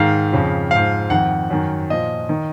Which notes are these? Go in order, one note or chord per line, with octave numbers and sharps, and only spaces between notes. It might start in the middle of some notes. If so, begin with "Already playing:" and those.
Already playing: G#2 D#3 F5
F2 C#3 F3
G#2 F3 F5
F2 D#3 F#5
F#2 D#3
A#2 F3 D#5
D#3